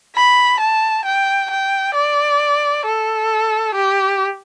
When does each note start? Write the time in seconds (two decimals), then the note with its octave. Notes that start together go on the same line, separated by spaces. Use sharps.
0.16 B5
0.60 A5
1.05 G5
1.51 G5
1.95 D5
2.86 A4
3.75 G4